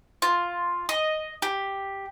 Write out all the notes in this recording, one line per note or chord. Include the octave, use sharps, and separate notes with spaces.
F4
D#5
G4